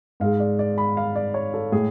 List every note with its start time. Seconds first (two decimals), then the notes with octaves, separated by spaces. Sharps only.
0.20 G#2 G#3 F5
0.40 D5
0.59 D5
0.78 B5
0.97 F5
1.16 D5
1.34 C#5
1.54 A4
1.72 A2 G#3 G#4